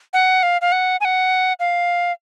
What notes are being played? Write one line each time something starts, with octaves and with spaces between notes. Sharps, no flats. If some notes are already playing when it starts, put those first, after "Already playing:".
F#5
F5
F5
F#5
G#5
F#5
F5